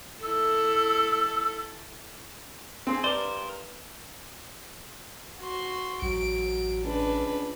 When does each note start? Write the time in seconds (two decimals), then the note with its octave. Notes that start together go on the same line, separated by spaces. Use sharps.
0.23 E4 A4 E6
2.87 C4 G#4 C6
3.04 G2 A#4 C5 D5
5.40 F#4 C6
6.02 A1 F#3 D7
6.84 C#2 D4 B4